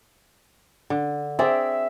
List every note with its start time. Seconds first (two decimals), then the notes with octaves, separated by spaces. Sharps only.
0.90 D3
1.39 C4 G#4 D5 E5